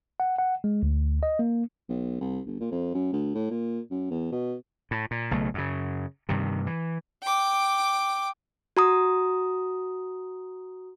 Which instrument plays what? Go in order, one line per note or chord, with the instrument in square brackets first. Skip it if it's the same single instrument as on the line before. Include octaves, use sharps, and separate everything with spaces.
[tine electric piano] F#5
F#5
G#3
D2
D#5
A#3
[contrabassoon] B1
C2
G1
A#2
F2
F#2
D2
A2
A#2
F#2
E2
B2
[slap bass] A2
A#2
B1 C#3 A3
F#2 C#3
G2 C3 D#3
E3
[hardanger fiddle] G5 D6
[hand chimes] F#4 A#5 D#6